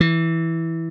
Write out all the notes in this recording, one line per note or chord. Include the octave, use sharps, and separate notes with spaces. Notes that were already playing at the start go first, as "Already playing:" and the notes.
E3